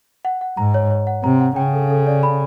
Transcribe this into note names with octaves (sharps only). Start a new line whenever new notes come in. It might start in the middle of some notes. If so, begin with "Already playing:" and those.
F#5
F#5
G#2 A#5
C#5
C#5
F#5
C3 A#5
F#5
C#3 G5
A4
A4
D5
B5